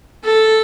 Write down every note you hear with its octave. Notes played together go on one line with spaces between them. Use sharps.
A4